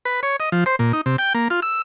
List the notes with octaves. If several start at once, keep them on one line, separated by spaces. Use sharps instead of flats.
B4
C#5
D#5
F3
C5
A#2
D#4
C3
G5
A#3
F4
E6